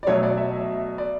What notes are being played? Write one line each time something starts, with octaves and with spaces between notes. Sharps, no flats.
D5
B2 F#3 A3 C#5
D5
E5
D5